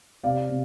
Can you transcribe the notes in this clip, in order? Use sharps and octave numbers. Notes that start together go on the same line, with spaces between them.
C3 D5 F5
C3